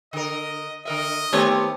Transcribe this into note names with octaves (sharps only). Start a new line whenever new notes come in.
D3 A#4 D#5
D3 A#4 D#5 E5
D#3 A3 B3 C4 G4 C#5